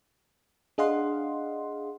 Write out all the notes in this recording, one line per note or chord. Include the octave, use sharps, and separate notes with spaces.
D4 G#4 D#5 F5 F#5 C6